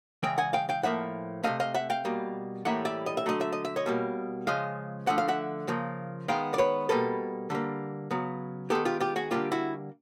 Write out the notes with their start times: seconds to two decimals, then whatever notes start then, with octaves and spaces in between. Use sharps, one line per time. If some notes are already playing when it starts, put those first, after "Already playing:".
0.23 C#3 E3 G#3 G5
0.38 F#5 G#5
0.53 F5 G5
0.69 F5 G5
0.83 A2 F3 A#3 E5 F#5
1.43 C3 F3 A3 D#5 F5
1.60 D#5 F5
1.74 E5 F#5
1.90 F5 G5
2.05 B2 G3 A#3
2.65 A2 E3 G3 A#3 E5 F#5
2.85 D5 E5
3.06 D#5
3.17 E5
3.26 D3 F#3 A3 D#5
3.41 E5
3.53 D#5
3.65 E5
3.76 C#5 D#5
3.86 B2 G3 A#3
4.47 C#3 F3 G#3 D#5 F5
5.07 D3 F3 A3 F#5
5.18 F5
5.28 E5 F#5
5.68 C#3 F3 A#3
6.28 D#3 G#3 B3 F5 G5
6.54 D5
6.58 B4 C#5
6.89 B2 G3 A#3 A4 B4
7.50 D3 G3 A#3
8.11 C#3 F#3 B3
8.70 D#3 G#3 B3 G4 A4
8.85 F4 G4
9.00 F4 G4
9.16 F#4 G#4
9.31 D3 G3 A#3 F4 G4
9.52 E4 F#4